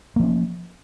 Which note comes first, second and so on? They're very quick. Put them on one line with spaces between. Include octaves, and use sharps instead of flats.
A#3 F3 C#4